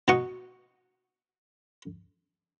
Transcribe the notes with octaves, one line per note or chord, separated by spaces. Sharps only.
B2 D#4 D#5 F#5 C#6